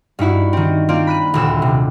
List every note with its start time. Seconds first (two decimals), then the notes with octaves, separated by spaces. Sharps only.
0.19 G2 D#4 E4 F#4
0.53 D#3 C4
0.89 A#3 C4 F4 D5
1.07 B5 F#6 D#7
1.34 D#1 D2 E6
1.62 C3